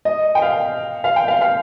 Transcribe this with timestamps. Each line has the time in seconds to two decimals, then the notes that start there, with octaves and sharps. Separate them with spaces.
0.05 D#5
0.35 G5
0.42 F5
1.04 F5
1.16 G5
1.28 F5
1.41 F5